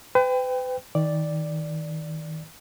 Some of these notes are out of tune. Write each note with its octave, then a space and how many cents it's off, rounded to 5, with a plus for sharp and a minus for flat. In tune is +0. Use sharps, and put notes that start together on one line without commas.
B4 +40 G5 +15
D#3 +25 D5 +0